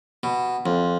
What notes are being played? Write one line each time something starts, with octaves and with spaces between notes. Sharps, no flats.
B2
F2